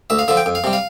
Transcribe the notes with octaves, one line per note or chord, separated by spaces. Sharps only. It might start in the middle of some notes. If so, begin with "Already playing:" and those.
D2 E5
F5
D3 F3 E5
G5
F2
F5
C3 G3
F5